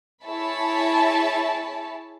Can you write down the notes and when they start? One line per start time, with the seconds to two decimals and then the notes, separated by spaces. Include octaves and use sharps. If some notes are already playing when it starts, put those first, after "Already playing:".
0.24 E4 G#4 C#5 E5 A5 B5